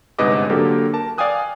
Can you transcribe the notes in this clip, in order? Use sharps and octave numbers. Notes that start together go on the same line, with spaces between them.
G1 G#2 C3 B4 D#5 D6
D3 F#3 A#3 G4 A4 A#4
A#4 A5
D5 F5 G5 G#5 D#6 F#6